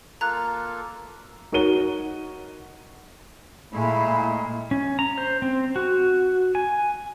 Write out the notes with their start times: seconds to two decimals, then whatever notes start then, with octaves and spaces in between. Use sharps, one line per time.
0.21 A#3 F4 A4 A#5 F#6
1.52 D#4 F#4 A#4 C#5 D#7 G7
3.73 A#2 G#3 A3 E4
4.71 C#4
4.99 A#5
5.18 C5
5.42 C4
5.76 F#4
6.55 G#5